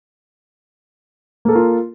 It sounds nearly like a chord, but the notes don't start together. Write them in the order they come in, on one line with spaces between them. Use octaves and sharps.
A#3 A4 A#4 F4